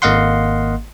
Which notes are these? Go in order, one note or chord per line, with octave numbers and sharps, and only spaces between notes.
G#1 A#3 D#5 F5 F#5 C6